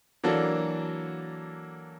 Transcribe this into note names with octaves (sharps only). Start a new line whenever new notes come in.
E3 F#3 A#3 D4 F#4 A4